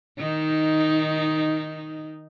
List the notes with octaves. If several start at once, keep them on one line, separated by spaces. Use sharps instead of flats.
D#3 D#4